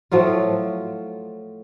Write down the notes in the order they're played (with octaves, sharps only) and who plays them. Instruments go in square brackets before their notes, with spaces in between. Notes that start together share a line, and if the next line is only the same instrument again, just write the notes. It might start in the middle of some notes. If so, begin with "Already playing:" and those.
[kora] A2 F3 F#3 F4